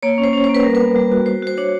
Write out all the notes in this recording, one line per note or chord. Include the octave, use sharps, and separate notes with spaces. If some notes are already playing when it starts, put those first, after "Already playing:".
A#3 C#5
C#4
C5
C#4
A#3 C5
B4
G3 A#4
B3 B4
G3
F#4
F#4 C5
F#4 C5
D4 C#5